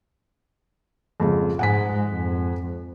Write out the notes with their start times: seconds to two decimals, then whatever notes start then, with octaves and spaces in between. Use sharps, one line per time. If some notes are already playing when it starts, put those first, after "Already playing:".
1.20 F2 G#2 C#3
1.59 G#2 G#3 F#5 G#5 B6
2.10 F2